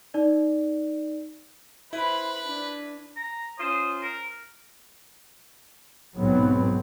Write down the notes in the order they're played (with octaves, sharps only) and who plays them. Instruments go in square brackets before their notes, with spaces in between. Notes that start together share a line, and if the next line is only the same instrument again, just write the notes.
[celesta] D#4 D5
[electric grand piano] E4 [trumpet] B4 [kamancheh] C5 B5
[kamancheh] D4
[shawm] A#5
[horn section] C#4 F4 C5 [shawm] D#6
[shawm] A#4
[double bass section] B1 G#2 F#3 B3 C4